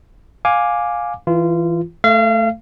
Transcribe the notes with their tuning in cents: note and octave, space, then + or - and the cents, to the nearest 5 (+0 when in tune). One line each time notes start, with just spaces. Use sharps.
F5 +15 G#5 -5 D6 +0
E3 +0 F4 -25
A3 +0 F5 -35